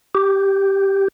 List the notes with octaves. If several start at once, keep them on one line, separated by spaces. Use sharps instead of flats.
G4